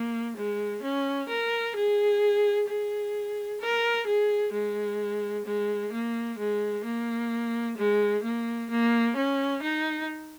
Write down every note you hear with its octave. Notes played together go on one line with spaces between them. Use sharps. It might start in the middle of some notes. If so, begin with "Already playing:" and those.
Already playing: A#3
G#3
C#4
A#4
G#4
G#4
A#4
G#4
G#3
G#3
A#3
G#3
A#3
G#3
A#3
A#3
C#4
D#4